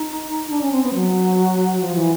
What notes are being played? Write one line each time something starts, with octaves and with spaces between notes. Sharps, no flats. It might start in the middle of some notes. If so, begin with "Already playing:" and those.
Already playing: D#4
D4
C#4
C4
B3
F#3
F3
E3